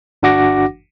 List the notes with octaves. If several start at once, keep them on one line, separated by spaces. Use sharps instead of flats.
G1 D4 F#4 F#5 D6 A#6